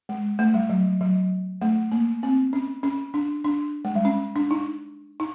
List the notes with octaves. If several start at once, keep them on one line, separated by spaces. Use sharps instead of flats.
G#3
A3
G3
F#3
F#3
A3
A#3
C4
C#4
C#4
D4
D4
G#3
G3
C#4
D4
D#4
D#4